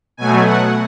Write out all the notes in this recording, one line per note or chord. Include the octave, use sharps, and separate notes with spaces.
B2 F#3 A3 G#5
F#5